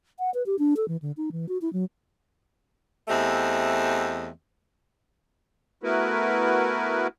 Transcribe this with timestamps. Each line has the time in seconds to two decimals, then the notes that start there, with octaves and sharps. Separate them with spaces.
0.19 F#5
0.34 B4
0.46 G4
0.59 D4
0.76 A4
0.88 E3
1.02 D3
1.17 D#4
1.32 E3
1.48 F#4
1.61 E4
1.73 F#3
3.08 E2 A3 C4 G4 D#5
5.83 A3 B3 E4 F#4 A#4 B4